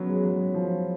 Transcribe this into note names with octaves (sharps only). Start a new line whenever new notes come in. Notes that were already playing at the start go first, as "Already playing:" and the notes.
Already playing: F#3 B3 C#4
G#3
F#3
F3